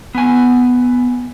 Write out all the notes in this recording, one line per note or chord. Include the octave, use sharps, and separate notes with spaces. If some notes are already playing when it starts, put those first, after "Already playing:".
B3 G#5